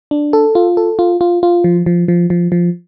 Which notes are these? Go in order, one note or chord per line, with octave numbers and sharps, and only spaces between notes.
D4
A4
F4
A4
F4
F4
F4
F3
F3
F3
F3
F3